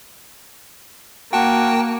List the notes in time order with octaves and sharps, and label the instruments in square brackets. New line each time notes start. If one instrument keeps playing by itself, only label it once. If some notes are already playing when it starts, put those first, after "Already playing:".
[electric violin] A#3 [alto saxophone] F#4 [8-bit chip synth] G5 A5